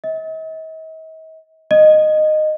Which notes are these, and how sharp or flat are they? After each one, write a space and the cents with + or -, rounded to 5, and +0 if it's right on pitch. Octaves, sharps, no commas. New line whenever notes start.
D#5 +45
D#5 -15